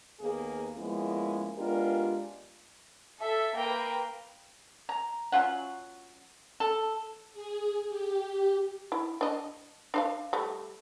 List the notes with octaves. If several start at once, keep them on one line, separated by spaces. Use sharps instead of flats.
D#2 A#3 B3 G#4
F3 G#3 A#3 B3 C#4 E4
G#3 B3 D4 F4 G4 A#4
A4 E5
A#3 A#4 B4 G5
A#5
F#3 C#4 F4 F#5
A4
G#4
G4
E4
D4 D#5
D4 C5 F5
G3 A3